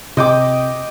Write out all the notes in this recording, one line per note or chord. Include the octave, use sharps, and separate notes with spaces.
C3 D#5 G5 D6